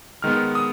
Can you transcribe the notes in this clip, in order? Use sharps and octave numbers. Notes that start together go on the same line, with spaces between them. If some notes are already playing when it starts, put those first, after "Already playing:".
D#3 G#3 B3 F6
D#6